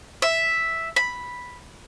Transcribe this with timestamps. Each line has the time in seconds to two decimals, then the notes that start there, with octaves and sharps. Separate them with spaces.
0.22 E5
0.96 B5